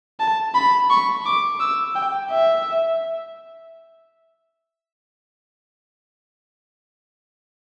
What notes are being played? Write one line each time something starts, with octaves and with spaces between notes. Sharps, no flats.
A5
B5
C#6
D6
E6
G5
E5